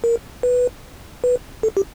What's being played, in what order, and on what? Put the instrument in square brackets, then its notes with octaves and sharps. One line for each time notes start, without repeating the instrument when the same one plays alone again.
[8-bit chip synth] A#4
B4
B4
A4
G4